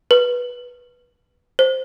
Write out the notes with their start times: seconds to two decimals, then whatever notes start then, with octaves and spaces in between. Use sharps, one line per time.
0.11 B4
1.59 C5